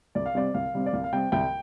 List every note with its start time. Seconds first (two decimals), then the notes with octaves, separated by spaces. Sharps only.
0.15 C2 D5
0.26 F5
0.35 C3 G3 C4 D5
0.54 C2 F5
0.74 C3 G3 C4
0.86 D5
0.93 C2 F5
1.04 F5
1.13 C3 G3 C4 G5
1.32 C2 G5